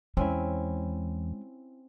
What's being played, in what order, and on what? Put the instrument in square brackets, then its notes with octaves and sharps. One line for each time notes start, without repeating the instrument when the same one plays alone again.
[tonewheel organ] E2 [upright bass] G#3 [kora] C4 C#4 E4